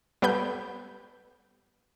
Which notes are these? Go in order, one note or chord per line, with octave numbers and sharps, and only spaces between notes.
G3 B3 A4 B4 B5 G6